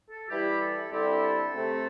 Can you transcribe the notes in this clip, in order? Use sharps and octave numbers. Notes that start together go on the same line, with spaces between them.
A4
E3 G3 E4 G4
A4
D3 G3 C4 E4 G4
A4
C3 A3 C4